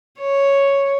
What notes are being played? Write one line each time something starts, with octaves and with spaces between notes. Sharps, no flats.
C#5